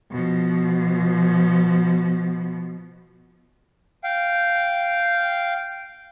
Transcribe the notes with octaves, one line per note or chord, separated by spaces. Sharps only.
B2 F3
F5 G5